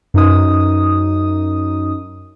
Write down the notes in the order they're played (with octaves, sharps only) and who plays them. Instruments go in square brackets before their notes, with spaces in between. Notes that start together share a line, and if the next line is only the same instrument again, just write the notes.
[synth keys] F#2 D#4 D#6